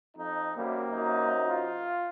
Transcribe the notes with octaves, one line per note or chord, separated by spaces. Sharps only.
F2 D#4
F#2 C3 G3 A#3
F#2 C3 D#4
F4